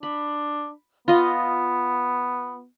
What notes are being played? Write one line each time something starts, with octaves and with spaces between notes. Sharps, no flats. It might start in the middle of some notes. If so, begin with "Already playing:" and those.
D4 B5
B3 F4 D#5